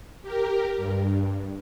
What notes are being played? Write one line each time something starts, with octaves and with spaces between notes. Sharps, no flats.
G4 A#4
G2